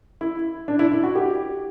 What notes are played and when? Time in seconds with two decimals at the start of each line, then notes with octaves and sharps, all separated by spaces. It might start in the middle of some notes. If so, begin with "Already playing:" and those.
0.21 E4
0.68 D4
0.79 E4
0.92 E4
1.04 F#4
1.15 G4